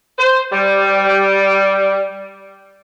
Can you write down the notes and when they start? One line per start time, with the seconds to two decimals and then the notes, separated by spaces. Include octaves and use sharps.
0.19 C5
0.52 G3